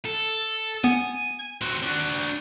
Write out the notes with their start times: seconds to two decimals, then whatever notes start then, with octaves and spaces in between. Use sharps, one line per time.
0.05 A4
0.84 B3 G#5
1.61 C4 F#4
1.83 D4 F#4